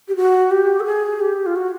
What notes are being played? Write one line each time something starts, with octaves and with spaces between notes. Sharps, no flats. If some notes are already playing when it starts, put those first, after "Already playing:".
G4
F#4
G4
A4
G#4
G4
F4
F#4